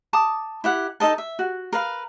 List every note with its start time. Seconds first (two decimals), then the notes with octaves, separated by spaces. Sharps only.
0.13 A5 D6 D#6
0.64 E4 G4 F#5
1.00 D#4 A4 D#5 A5
1.18 E5
1.39 F#4
1.73 A#4 B4 F5